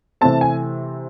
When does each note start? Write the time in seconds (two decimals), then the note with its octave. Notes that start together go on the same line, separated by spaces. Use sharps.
0.21 C3 E3 A3 C4 A5
0.41 G#5